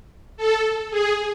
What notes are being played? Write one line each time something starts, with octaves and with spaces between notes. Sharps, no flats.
A4
G#4